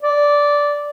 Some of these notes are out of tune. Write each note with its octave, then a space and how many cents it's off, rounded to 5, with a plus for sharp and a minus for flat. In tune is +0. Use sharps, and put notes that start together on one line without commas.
D5 -10